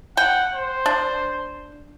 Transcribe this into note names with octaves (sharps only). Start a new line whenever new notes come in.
F#5 G5
C5
D4